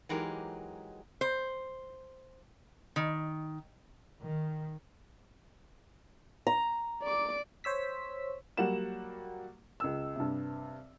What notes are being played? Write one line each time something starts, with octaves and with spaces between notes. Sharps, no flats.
E3 F#3 G#3 D#4 G4 A#4
C5
D#3
D#3
A#5
D5 D6
C5 C#5 E6 B6
F#3 G3 A#3 F#5 E7
C#2 E6
G2 C3